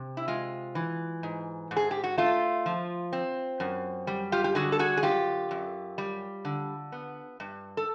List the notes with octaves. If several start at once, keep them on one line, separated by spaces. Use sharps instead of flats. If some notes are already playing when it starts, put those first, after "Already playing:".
Already playing: C3
E4
G#3 F4
E3
G#2
G#2
G#4
G4
F#4
A3 F4
F3
C4
F#2
G3
F4 G4
G4
D3 F#4 G#4
A4
F#4 G#4
G#4
F#2 F4 G4
F#2
G3
D3
B3
G2
A4